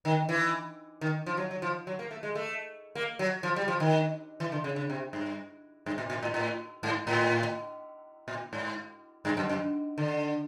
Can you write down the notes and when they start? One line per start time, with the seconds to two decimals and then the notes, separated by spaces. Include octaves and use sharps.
0.05 D#3
0.29 E3
1.01 D#3
1.26 F3
1.37 F#3
1.51 F#3
1.62 F3
1.87 F#3
1.99 A#3
2.11 A3
2.23 G#3
2.35 A3
2.95 A#3
3.19 F#3
3.43 F3
3.56 G3
3.68 F3
3.80 D#3
4.40 E3
4.52 D3
4.64 C#3
4.76 C#3
4.90 C3
5.13 G2
5.86 G2
5.98 A#2
6.10 A#2
6.23 A2
6.34 A2
6.83 G#2
7.07 A2
8.28 A#2
8.53 G#2
9.25 G2
9.37 F#2
9.49 F#2
9.98 D3